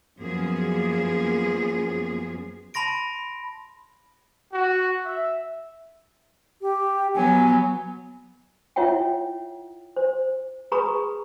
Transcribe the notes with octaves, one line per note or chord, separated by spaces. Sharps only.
F#2 F3 A#3 B3 G#4
A5 B5 C6 A#6 D7
F#4
E5
G4
F#3 B3 G#5
E4 F4 C#5 E5 F#5 G5
C5
G#4 B4 A#5 B5 C#6 D#6